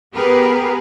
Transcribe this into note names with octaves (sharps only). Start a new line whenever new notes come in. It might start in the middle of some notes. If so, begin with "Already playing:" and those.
B3 G4 G#4 A#4 B4